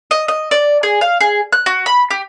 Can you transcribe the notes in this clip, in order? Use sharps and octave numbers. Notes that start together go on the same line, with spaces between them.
D#5
D#5
D5
G#4
F5
G#4
F#6
F#4
B5
G4